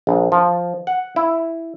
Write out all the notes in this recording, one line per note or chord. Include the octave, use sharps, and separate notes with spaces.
A#1
F3
F#5
E4